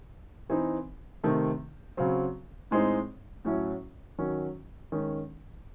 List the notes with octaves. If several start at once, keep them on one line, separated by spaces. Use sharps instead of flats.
E3 C4 D#4
C3 D#3 A3
C#3 F#3 C4
A2 G#3 C4 D#4
A2 F#3 C#4 E4
D#3 F#3 C#4
D#3 G#3 C#4